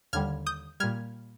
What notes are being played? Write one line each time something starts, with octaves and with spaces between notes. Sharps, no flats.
D#2 D3 G3 F6 G#6
D#6 G6
A#2 G3 F6 G#6